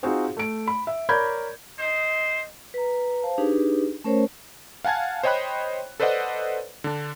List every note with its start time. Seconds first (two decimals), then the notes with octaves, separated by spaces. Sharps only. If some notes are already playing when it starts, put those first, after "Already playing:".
0.03 C4 D#4 F4 F#4 G#4 C5
0.37 A3 D7
0.67 B5
0.87 E5
1.09 A#4 C#5 D5 B5 G6 G#6
1.79 C5 D#5
2.74 B4 A#5
3.22 C5 F5 A5
3.38 D4 D#4 G4 G#4 B4
4.04 A3 C#4 A#4 C5 C#5
4.85 F5 F#5 G#5 A5 G#6
5.23 C5 C#5 D#5 G5 B5 F#6
6.00 A4 B4 C5 D5 D#5 F#5
6.84 D3 D4